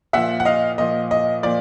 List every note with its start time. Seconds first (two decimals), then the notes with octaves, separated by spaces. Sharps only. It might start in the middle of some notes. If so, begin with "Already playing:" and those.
0.13 A#2 F3 E5 F#5
0.40 F#5
0.45 D#5 F5
0.78 A#2 F3 D#5
1.11 D#5
1.43 A#2 F3 D5